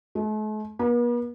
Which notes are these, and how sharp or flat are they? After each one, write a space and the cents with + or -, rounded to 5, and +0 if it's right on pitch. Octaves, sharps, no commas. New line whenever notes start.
A3 -45
B3 -45